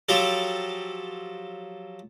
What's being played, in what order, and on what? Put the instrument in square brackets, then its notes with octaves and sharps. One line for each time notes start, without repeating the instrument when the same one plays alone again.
[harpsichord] F3 F#3 G4 A4